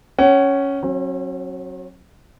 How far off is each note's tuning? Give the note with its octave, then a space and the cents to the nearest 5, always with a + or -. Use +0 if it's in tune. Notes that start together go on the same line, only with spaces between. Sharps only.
C#4 +0 F#5 +35
F#3 +0 C#4 -45